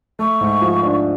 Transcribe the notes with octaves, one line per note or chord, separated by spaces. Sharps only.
A3 C#6
G#2
F3
D4